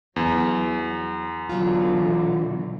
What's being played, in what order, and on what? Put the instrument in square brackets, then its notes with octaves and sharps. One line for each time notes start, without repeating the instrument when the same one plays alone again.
[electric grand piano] E2 [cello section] F#3
[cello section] B2 D3 E3 [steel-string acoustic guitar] F#3 D4 F4